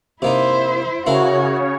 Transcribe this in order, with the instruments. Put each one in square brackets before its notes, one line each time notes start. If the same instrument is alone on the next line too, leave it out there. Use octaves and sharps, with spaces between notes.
[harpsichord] C3 A#3 D#4 [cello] E4 C5
[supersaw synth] C#3 C#5 [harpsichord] E4 A#4 F5 [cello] F#4